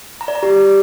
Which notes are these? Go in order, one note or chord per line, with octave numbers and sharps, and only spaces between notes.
A#5
D5
A#5
G4